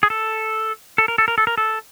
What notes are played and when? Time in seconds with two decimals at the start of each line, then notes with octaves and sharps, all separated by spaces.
0.03 G#4
0.10 A4
0.98 A4
1.08 A#4
1.18 A4
1.28 A#4
1.38 A4
1.47 A#4
1.58 A4